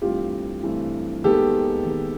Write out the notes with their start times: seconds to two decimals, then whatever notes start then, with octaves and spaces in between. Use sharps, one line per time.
0.01 G2 E3 A3 C4 F4 G4
0.63 G2 E3 A3 C4
1.24 D#2 D#3 G#3 B3 G4 A4
1.86 D#2 D#3 G#3 B3